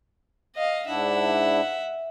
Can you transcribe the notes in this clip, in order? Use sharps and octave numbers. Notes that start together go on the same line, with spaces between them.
D#5 F5
G#2 D4 E4 E5 F#5